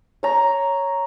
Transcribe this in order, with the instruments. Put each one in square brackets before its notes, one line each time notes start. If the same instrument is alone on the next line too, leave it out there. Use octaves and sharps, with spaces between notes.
[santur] C#5 A#5